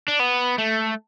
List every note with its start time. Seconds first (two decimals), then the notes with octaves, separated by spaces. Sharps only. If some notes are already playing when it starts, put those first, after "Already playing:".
0.08 D4
0.20 B3
0.59 A3